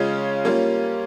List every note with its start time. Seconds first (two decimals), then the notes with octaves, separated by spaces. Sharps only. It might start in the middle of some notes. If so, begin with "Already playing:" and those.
Already playing: C#3 G#3 C#4 F4
0.45 G3 A#3 C#4 F4